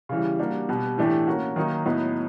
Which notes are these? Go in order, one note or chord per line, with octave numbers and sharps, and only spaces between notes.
C#3 E3 G3
G3 A#3 D4 F#4
B2 G3 B3
A2 E3 A3 D4 G4
A#3 C#4 F#4 A#4
D#3 F#3 A#3 D#4
A2 F#3 B3 D#4